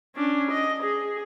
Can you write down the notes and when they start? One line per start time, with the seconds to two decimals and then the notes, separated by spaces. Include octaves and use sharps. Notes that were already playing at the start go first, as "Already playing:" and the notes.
0.15 C#4 D4
0.51 D#5
0.83 G#4